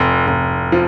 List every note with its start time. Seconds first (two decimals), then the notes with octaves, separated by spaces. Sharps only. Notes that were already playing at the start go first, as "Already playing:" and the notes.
Already playing: F1
0.27 F1
0.72 F3